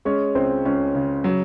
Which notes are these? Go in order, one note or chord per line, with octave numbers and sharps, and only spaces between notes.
G#3 C#4 C#5
C#2 C4 C5
C#2 C#4 C#5
C#3
F#3